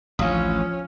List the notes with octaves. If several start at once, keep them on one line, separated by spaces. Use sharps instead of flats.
A1 D2 F3 C#4 F5 D#6